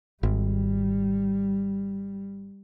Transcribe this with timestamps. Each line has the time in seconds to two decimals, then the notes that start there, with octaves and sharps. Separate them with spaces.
0.23 G#1 G3